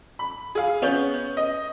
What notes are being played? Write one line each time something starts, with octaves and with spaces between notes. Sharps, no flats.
B5
G#4 F5
B3 C#4 G6
D#5